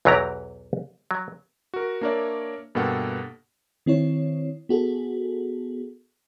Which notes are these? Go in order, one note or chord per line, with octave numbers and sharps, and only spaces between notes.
B1 E2 E3 F#3 G4 A#5
F#3
F#4 A#4
A#3 D4 A#4 C#5 D5 E5
G2 B2 A#3 A4 F#5 G5
D#3 C4 E4 C#5
B3 F#4 G#4 A4